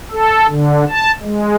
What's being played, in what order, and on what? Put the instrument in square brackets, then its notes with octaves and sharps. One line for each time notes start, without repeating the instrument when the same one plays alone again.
[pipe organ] A4
D3
A5
G#3